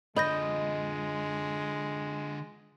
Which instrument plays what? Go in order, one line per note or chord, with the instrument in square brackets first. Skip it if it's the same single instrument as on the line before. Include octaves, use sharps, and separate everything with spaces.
[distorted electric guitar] D3 F4 [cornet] G#3 [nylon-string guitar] D#5 [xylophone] B5 G6 A#6